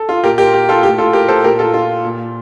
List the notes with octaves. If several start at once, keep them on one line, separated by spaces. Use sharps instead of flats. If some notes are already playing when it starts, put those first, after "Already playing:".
Already playing: A4
F4
A#2 G4 A#4
G4 A#4
G4
F4 A4
A2 G4
F4 A4
G4 A#4
A4 C5
A#2 G4 A#4
F4 A4
F4
A#2